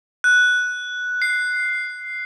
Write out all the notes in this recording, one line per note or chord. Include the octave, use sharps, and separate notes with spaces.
F#6
C7